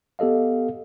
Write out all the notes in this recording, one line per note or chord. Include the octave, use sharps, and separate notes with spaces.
B3 G4 A4 D#5 F5